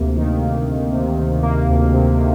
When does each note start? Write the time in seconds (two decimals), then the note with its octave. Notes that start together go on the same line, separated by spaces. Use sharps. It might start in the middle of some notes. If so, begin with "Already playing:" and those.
Already playing: D2 C3 A#3
0.17 D#3
0.41 A#3
0.66 D2
0.92 C3
1.18 D#3
1.43 A#3
1.69 D2
1.93 C3
2.19 D#3